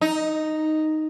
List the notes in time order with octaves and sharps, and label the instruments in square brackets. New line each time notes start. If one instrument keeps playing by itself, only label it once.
[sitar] D#4